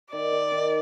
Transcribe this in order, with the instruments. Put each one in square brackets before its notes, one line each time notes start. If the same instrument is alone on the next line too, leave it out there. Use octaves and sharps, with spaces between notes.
[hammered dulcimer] D#3 [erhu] D5
[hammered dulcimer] D#3
D#3